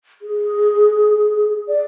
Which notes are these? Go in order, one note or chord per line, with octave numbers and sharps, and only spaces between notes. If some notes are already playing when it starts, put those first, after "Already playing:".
G#4
D5